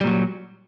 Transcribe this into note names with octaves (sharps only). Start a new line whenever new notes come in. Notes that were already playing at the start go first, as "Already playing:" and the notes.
A#2 F#3 G3